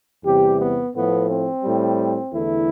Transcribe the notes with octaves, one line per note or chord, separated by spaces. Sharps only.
E2 C3 G3 G4
B3
A2 F3 A3 B3
C4
A2 G3
E2 D3 A3 E4